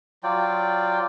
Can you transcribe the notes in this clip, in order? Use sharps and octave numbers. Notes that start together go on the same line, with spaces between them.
F#3 F4 D5 G5